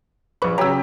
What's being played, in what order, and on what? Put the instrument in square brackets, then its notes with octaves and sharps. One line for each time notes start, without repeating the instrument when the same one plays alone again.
[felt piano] A#1 C#6 [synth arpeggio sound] B4 B5
[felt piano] C#3 F#3 [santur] G4 [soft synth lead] C#5 [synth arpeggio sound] A#5 E6